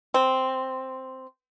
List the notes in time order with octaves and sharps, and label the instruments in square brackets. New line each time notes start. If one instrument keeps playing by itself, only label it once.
[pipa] C4